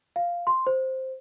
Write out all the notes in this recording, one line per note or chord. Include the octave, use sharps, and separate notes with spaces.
F5
C6
C5